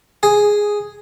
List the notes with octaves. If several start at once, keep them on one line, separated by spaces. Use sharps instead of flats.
G#4